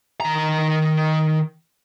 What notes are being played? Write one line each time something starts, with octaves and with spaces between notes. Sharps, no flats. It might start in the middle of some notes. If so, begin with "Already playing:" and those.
D#3 A#5